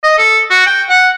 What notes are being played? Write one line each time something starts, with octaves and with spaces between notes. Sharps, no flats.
D#5
A4
F#4
G5
F#5